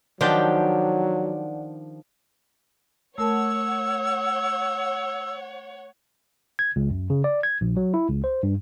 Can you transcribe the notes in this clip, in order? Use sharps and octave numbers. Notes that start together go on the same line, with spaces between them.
D#3 F3 F#3 D4 G4 D5 F#5
A3 A#4 C#5 F#5 A5 E6
G#6
C#2
F#2
C#3
D5
G#6
A#1
F#3
E4
C#2
C5
G2